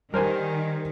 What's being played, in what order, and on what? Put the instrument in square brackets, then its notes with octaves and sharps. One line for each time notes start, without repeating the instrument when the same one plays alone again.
[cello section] D#3 [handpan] G3 [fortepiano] A#4 C5 G#5